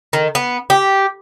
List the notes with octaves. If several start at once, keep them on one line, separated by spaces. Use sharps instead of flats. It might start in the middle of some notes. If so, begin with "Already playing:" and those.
D#3
B3
G4